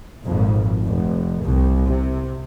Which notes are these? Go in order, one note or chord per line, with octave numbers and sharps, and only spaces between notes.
G#1 F2 A#2
F1
C2
C3